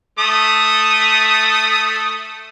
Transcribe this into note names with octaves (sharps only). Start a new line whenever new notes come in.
A3 D#6